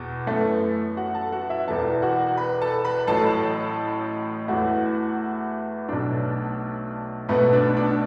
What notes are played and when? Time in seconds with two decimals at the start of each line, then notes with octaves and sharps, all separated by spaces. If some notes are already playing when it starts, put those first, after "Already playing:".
Already playing: E2 B2
0.26 F#2 E3 A3 B3 A4
0.97 F#4 F#5
1.15 A4 A5
1.32 F#4 F#5
1.49 E4 E5
1.68 E1 E2 E3 B3 A4 A5
2.02 F#4 F#5
2.37 B4 B5
2.62 A4 A5
2.85 B4 B5
3.07 A1 A2 F#3 A4 A5
4.48 E2 E3 A3 F#4 F#5
5.88 B1 B2 F#3 A3 D4 D5
7.29 B1 B2 A3 B3 B4
7.53 D4 D5
7.77 D4 D5